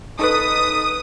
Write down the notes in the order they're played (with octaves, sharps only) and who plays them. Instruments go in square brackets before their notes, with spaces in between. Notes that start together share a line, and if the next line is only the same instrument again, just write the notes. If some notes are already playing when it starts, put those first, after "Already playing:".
[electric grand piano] D#4 A4 B4 [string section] D#6